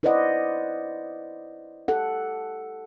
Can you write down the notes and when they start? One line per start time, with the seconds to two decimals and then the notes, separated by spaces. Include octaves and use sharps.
0.03 E4 B4 C5 D5 D#5 F#5
1.88 G4 A4 F#5